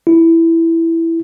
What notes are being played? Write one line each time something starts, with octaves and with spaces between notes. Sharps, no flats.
E4